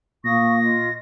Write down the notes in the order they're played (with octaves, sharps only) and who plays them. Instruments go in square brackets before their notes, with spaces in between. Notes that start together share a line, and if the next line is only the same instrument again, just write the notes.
[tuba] A#2 [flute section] F5 C#6 D#6 [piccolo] A#6
[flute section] F4 D#5